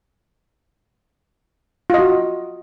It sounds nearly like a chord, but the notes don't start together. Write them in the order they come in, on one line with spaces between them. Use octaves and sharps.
F4 D#5 F#4